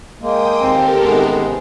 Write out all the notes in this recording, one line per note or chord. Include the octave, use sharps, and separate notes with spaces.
G#3 A#3 G5 D#6
D#2 C4 G4 A4 A#4
A1 C3 D#3 G#3 B3